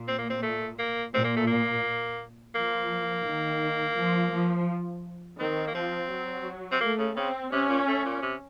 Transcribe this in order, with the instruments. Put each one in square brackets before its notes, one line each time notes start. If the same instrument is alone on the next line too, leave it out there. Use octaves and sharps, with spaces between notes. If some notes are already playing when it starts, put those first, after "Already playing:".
Already playing: [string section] A#2
[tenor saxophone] C4
A#3
C4
A3
A#3
[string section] A#2 [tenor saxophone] C4
[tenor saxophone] A#3
A3
A#3
[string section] F3 [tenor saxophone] A#3
[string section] D#3
F3
F3
[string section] D#3 [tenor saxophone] C4
[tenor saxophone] A#3
[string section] F3 [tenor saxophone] C4
[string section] F#3
[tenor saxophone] C4
[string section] A3 [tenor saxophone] A#3
[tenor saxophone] C#3
[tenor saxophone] C#3 [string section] C4
[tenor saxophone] C3 [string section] C#4
[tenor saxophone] A#2
A3
A#2
C3